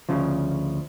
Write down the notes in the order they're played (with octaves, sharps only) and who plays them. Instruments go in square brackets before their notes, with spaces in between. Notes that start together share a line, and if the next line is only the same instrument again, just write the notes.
[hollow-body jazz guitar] D2 C#3 F3